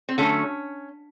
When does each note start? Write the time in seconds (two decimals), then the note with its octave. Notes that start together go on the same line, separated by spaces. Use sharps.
0.09 C4
0.18 D3 F#3 A3 C#4